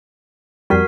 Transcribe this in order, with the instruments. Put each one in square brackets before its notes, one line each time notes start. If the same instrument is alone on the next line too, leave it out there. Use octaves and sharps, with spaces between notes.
[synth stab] F2 G3 [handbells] F#4 A#4 B6